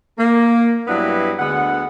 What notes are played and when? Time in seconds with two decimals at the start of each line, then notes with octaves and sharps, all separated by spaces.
0.18 A#3
0.88 G2 F#3 B3 D4 E4 B4
1.38 D2 D3 G#3 B3 F#5